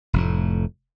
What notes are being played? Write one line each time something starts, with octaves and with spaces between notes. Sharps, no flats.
F1 F2 A2